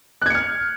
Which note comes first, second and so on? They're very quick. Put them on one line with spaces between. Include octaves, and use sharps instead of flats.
F#6 G#6 C#7 F6